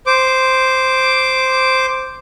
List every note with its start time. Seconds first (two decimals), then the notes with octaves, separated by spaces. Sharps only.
0.06 C5 D6